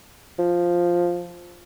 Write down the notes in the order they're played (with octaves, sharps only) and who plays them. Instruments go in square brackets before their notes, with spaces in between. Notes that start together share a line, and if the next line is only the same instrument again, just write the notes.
[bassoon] F3